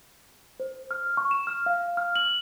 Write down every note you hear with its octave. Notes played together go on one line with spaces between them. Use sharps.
C5
F6
C#6
E7
F6
F5
F6
F#7